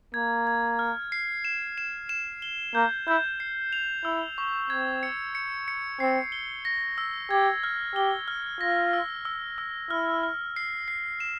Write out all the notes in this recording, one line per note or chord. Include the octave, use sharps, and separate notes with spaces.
A#3 G#6
G#6
F6
C7
E7
E7
E7
G7
A#3 G6
E4 G6
C7
F7
E4 E6
C#6
C4 G#6
C#7
C#7
C#7
C4 C7
G7
A#6
E6
G4 G#6
F6
G4 G7
F6
F4 A#6
E6
E6
E6
E4 F6
F6
C7
C7
E7